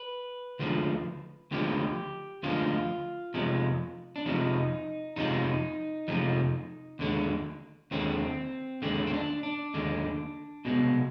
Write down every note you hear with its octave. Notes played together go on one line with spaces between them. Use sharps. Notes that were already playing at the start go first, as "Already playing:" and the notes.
Already playing: B4
D2 D3 F3 G#3
D2 D3 F3 G#3 G4
D2 D3 F3 G#3 F4
F2 C3 F3 G#3
D4
F2 C3 F3 G#3 D#4
F2 C3 F3 G#3 D#4
F2 C3 F3 G#3
D#2 D3 G#3
D#2 D3 G#3 C4
D#2 D3 G#3 C4
C4
D4
D4
D#2 D3 G#3
C2 B2 G#3